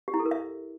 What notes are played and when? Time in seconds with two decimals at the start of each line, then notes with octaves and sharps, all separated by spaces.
0.08 G4
0.14 E4
0.20 A4
0.25 A#4
0.31 E5